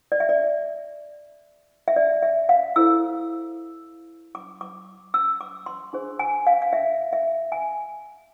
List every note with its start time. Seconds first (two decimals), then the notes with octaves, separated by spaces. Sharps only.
0.12 D5
0.20 E5
0.29 D5
1.88 E5
1.96 D5
2.22 E5
2.49 F5
2.76 E4 A4 C5 E6
4.35 D6
4.61 D6
5.14 E6
5.41 D6
5.66 C6
5.93 D4 G#4 C5
6.19 G#5
6.47 F5
6.62 F5
6.73 E5
7.13 E5
7.52 G#5